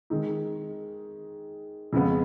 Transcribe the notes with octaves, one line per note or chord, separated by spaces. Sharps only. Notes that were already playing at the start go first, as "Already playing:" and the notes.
D#3 G#3 D#4
F2 C#3 G#3 B3